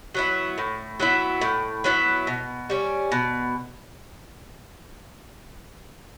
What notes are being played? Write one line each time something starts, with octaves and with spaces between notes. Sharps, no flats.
F#3 B3 E4
A2
F#3 B3 E4
A2
F#3 B3 E4
B2
G3 C#4
B2